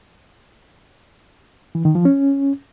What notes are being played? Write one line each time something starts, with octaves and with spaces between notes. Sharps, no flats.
E3
D#3
F3
C#4